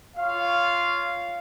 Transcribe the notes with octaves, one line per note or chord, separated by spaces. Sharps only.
F4 C#5 F5